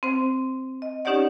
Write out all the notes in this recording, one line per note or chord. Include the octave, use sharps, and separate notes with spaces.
C4 C5
D#5
C#4 D#4 G4 C#5 D5 F#5